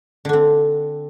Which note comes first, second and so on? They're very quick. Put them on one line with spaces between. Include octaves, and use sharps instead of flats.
D3 D4 C4